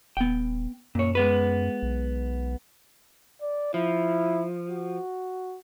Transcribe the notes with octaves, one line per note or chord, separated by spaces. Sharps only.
D#1 B3 G5
F#2 A#2 C#5
G#3 B3 B4
B1
D5
F3 E4
F#4